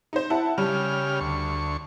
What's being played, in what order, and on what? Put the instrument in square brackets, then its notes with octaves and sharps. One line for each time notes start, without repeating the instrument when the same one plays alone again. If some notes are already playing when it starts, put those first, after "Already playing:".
[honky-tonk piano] D#4 C5
E4 F#5 A5
[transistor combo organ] C#3 G4 F6 [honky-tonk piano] G3
[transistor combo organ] D2 C#6